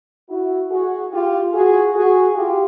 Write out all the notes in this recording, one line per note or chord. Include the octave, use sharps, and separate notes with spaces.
E4 F#4
F#4 G#4
F4 G4
F#4 G#4
F#4 G#4
F4 G4